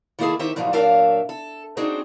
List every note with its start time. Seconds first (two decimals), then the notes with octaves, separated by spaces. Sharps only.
0.19 D#3 A#3 E4 F#4 G#4 A4
0.39 D#3 D#4 G4 C5 E5
0.56 G2 A#2 F3 F#3 D#4
0.73 A#2 F#3 D4 A#4 E5 F5
1.29 A4
1.77 C4 D4 D#4 F#4 G#4 C5